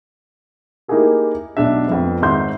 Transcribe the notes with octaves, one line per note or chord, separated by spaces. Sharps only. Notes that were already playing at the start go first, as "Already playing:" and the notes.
A#3 D#4 E4 G4 G#4 A#4
B1 D4 E5
F2 F3 B3
G#1 C4 E5 C6 G6